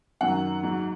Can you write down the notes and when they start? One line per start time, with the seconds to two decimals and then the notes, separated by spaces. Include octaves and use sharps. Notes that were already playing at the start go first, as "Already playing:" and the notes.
0.21 F#2 D#3 F#3 F#5
0.63 G#2 F#3